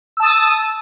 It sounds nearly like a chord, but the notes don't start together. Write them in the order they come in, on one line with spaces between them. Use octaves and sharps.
E6 A5 D#6